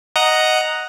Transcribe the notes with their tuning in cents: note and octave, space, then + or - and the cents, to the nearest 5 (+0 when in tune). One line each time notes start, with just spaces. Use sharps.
D#5 +0 F#5 +0 A#5 +0